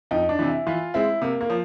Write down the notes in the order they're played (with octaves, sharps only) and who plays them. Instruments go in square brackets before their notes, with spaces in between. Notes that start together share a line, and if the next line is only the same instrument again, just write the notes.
[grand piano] F2 [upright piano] D#4
[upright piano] D4
[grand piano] C3 E3
[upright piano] E4
[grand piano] E3 [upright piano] F4
[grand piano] G#3 C4 [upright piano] E4
[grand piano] C3 [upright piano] A#3
[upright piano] A#3
[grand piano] F3